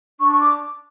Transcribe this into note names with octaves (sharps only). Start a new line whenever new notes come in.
D4 C#6
C#6
D6